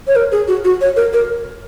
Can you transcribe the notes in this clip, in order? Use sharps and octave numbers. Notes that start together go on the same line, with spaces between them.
C#5
A#4
G#4
F#4
F#4
C#5
A#4
A#4